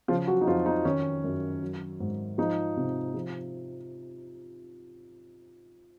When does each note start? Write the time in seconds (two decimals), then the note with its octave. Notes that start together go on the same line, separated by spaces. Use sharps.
0.08 C#3 F3 F4
0.27 F#3 F#4
0.41 D#4
0.47 F2 F3 F4
0.66 D#4
0.85 D#3 C#4
1.24 F#2
1.62 F#3
2.00 G#2
2.38 F3 D#4
2.77 C3
3.14 F3